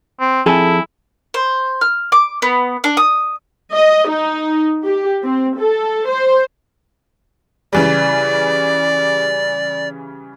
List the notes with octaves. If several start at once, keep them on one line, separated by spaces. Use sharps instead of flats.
C4
F2 E4 G#4 A4
C5
F6
D6
B3
D4
D#6
D#5
D#4
G4
C4
A4
C5
C#3 E3 G3 D5